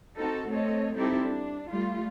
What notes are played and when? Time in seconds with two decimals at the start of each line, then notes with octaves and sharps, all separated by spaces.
0.17 C4 D#4 F#4 A4
0.49 A3 C4 A4 C#5 D#5
0.96 G3 C4 D#4 E4 G4 A4
1.25 D4
1.70 G3 A3 F4